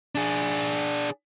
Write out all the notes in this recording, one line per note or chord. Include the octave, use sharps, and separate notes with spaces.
D4 G#4